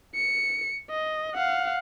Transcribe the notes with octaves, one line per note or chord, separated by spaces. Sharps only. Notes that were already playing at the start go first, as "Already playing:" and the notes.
C#7
D#5
F5 F#5